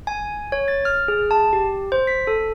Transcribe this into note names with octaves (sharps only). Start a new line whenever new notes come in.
G#5
C#5
A6
F6
G#4
A5
G4
C5
B6
A4